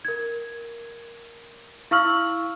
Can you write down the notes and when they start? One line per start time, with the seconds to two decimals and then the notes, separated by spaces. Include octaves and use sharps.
0.05 A#4 G#6
1.91 E4 F5 C#6 E6 F6 F#7